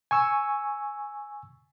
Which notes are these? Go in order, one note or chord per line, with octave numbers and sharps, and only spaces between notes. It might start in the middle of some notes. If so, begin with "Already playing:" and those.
G#5 C#6 E6